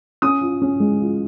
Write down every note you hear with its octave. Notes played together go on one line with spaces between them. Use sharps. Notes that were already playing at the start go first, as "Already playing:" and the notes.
C#4 D#6
F4
C#4
G#3
F4